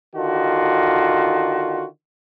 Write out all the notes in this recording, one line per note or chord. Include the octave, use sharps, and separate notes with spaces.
D3 D#3 F4 F#4